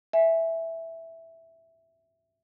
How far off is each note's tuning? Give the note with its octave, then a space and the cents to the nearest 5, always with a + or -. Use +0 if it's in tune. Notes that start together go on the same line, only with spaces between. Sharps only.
E5 +0 G#5 +0